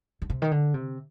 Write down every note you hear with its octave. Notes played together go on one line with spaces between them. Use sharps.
D3
C3
D#3
D3
C3